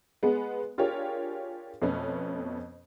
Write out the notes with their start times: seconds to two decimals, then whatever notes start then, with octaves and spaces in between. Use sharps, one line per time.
0.23 G#3 B3 G#4 B4 F#5
0.78 D4 F4 G4 G#4 A#4 C#5
1.82 F2 B2 A3 B3 C#4